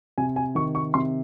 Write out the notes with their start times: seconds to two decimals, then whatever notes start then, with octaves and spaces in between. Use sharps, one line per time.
0.18 C3 G#5
0.36 G#5
0.55 D#3 C#6
0.75 C#6
0.94 C3 C6